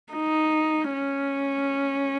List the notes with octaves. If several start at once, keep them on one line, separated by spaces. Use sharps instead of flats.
D#4
C#4